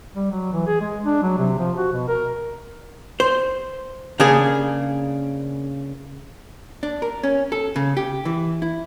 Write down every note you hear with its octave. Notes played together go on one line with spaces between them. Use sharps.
G3
F#3
E3
G#4
G#3
D4
F#3
C3
F3
F#4
B2
A#4
C5
C#3 A#3 D4 G#4
D4
A#4
C#4
A4
C#3
G4
E3
E4